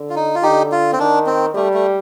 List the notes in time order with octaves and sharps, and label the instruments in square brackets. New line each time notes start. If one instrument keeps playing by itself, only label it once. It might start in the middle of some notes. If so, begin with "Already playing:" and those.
Already playing: [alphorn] D3
[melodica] F4
D#4
F4
[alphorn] D3 [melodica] D#4 G4
[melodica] F4
C4
[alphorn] D#3 [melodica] D4
[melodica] C4
[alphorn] G3 [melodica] A3
[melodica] A3